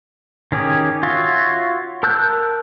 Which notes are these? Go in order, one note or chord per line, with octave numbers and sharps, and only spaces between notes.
D#3 C#4 G4 G#4
F4 F#4 C#5 E5
A#4 A5 E6 F#6 G6